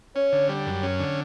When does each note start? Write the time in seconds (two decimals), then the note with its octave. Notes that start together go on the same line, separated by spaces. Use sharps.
0.16 C#4 C#5
0.32 D3
0.49 G3
0.67 F#2
0.83 C#4
1.00 D3